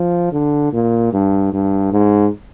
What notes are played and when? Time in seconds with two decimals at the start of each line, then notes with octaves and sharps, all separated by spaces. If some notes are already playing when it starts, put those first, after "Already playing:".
Already playing: F3
0.32 D3
0.73 A#2
1.13 G2
1.52 G2
1.92 G#2